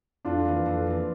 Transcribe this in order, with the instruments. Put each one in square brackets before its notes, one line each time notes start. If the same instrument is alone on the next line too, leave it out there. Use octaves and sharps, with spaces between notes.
[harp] F2 [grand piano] D4 F4
[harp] E3 A#3
F2
E3 A#3